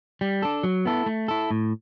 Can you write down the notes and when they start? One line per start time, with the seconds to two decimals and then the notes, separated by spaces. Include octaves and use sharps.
0.21 G3
0.42 D4 A4
0.63 F#3
0.85 B3 E4 A4
1.06 A3
1.28 E4 A4
1.51 A2